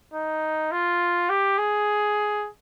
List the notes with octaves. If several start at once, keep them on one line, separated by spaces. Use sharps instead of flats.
D#4
F4
G4
G#4